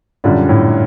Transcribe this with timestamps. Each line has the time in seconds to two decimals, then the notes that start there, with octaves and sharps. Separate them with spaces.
0.24 F#2 A#2 D3 G3
0.49 A2